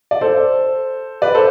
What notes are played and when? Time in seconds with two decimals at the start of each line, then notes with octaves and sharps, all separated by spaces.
0.11 D5
0.21 A4 C5
1.22 B4 D5
1.35 A4 C5